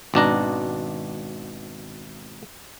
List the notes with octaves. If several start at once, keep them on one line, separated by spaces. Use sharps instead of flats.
G#1 B2 D4 A#5